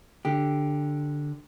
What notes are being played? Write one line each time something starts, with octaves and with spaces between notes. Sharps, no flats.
D3 G4